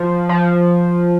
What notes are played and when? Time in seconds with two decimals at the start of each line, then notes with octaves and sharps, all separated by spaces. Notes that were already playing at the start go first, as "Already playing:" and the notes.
Already playing: F3
0.29 F3